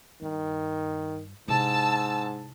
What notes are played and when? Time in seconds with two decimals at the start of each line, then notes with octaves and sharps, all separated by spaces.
0.22 G2 D#3
1.48 G#2 C3 E4 A5 E6